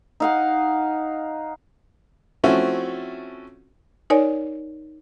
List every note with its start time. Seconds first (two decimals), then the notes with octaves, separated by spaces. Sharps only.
0.20 D#4 F5 F#5
2.43 F3 A3 C4 C#4 E4 F#4
4.10 D#4 A#4 C#5 D5 G#5